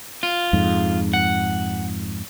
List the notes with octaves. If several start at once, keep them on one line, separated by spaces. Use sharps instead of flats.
F4
F2 G#2
F#5